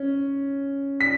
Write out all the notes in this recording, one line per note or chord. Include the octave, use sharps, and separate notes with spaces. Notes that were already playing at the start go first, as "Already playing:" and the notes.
Already playing: C#4
B6